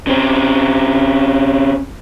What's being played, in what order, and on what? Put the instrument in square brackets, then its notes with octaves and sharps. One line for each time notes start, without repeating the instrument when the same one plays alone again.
[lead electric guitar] C#3 C4